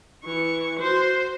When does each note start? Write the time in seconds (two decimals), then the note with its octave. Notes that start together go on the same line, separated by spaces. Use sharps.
0.24 E3 C#6
0.79 F#4 C5